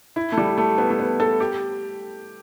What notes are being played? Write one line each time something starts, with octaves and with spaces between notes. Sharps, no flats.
E4
A3
G3
A3
B3
A3
B3
A4
G4